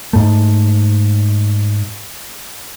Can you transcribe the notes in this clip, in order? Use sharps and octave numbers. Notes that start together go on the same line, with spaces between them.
G#2 A3